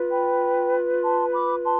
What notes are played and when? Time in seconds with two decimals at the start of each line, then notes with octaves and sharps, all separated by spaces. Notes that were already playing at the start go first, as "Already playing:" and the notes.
Already playing: F4 B4
0.10 G5 B5
1.03 A5 C6
1.34 B5 D6
1.65 A5 C6